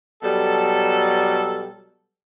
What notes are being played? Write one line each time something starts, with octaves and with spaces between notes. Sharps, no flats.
B2 F#3 G3 A4